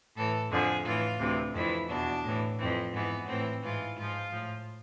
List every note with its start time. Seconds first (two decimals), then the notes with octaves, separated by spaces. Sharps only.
0.16 A2 E3 A4
0.50 F2 D3 F3 G#4
0.85 A2 E3 F4
1.20 D2 C3 E3
1.54 F2 E3 E4
1.89 E2 B2 D4
2.24 A2 E3
2.59 F2 E3 C4
2.93 G#2 E3 B3
3.28 A2 E3 C4
3.63 G#2 E3 F4
3.97 G#2 F3 F4
4.32 A2 F3